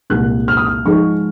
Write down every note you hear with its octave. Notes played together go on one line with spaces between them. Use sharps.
C2 A#2 G#3 F#6
F6
D#6
F6
G#2 F3 G#3 C#6